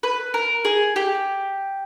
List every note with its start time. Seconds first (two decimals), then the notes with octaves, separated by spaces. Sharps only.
0.03 B4
0.34 A#4
0.65 G#4
0.96 G4